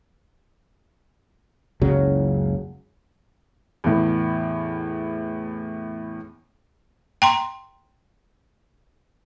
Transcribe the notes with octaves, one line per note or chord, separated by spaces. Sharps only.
F#1 C#2 C#3 F#3
E2 A2
G5 A#5 C6